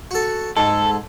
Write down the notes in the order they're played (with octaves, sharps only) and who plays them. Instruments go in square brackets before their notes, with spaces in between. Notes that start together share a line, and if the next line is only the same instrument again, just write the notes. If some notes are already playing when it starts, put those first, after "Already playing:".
[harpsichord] F#4 A4
[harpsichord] G#2 [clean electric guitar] A4